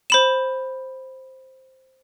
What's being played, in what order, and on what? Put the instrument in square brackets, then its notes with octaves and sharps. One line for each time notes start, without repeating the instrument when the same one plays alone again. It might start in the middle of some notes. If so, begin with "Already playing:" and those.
[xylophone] C5 B5 E7